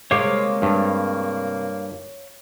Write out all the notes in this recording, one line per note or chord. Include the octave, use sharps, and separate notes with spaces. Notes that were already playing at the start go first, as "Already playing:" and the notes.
C3 G#3 A#3 C#5 F5 D6
G2